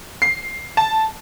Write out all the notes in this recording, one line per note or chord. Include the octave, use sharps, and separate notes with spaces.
C7
A5